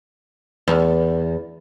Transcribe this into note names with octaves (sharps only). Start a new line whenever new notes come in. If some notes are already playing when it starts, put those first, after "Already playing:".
E2